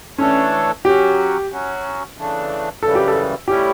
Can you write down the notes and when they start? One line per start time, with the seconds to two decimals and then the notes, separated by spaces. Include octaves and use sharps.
0.18 E3 A3 C#4 D4 A4 C#5
0.85 F#3 C#4 F#4 G4
1.50 F#3 C#4 F#4
2.16 C#3 E3 A3 D4
2.82 F#2 C#3 E3 G3 A4
2.95 G4
3.08 A4
3.48 A2 G3 C#4 E4 G4